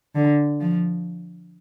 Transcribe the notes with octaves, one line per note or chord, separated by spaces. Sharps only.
D3
F3